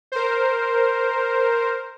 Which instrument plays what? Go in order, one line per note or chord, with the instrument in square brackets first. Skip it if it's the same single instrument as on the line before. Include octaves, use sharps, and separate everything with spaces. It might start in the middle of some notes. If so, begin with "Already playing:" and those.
[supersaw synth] A#4 C5